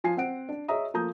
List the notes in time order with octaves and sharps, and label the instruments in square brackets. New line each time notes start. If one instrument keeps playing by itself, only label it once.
[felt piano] F3 F4 G#5 C7
C4 C5 F#5 D7
D4
G#4 C#5 D#5 E5 A#5 D#6
F3 A3 A#3 A#5 D#6 G6